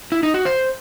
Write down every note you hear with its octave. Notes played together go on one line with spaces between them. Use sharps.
E4
D#4
F#4
C5